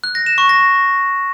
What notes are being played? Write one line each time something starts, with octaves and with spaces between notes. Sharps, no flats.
F#6
A#6
E7
C#6
A#6